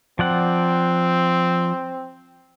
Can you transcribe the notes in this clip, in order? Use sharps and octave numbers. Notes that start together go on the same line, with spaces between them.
F3 C4 D5 F#5